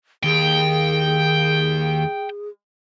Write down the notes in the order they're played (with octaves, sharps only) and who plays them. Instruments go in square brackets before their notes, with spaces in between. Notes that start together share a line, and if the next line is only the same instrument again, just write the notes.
[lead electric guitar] D#2 [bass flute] G#4 [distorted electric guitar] G5